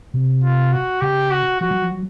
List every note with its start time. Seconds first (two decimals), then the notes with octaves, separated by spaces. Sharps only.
0.14 C3
0.44 F4
0.72 F#4
1.01 C#3 G4
1.31 F#4
1.60 F3 F#4
1.71 F#3
1.82 F3
1.92 F#3